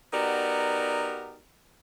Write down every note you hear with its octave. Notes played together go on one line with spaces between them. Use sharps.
B3 D#4 F#4 G4 A#4 D5